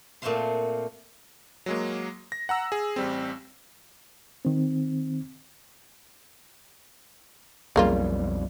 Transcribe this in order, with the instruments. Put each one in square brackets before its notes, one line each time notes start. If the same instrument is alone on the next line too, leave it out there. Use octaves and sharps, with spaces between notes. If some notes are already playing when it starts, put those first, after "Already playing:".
[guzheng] A#2 A3 C4 C5 F5 C6
[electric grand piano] F#3 G#3 A#3
A#6
F#5 A#5 E6
G#4
A1 G3 C4
[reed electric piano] D#3 C4
[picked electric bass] B1 F2 G3 [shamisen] C#3 A#3 F4